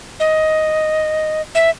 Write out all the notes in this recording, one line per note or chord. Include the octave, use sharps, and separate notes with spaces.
D#5
E5